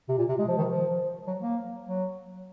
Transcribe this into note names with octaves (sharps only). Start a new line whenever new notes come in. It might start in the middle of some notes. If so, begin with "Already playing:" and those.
C3
A#2
C3
G#3
F3
D#3
F3
F#3
A#3
F#3